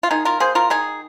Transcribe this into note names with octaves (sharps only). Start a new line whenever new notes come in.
F4
D#3 D#4 G#4
F4 A#4
A#3 G#4 C5
F4 A#4
D#3 D#4 G#4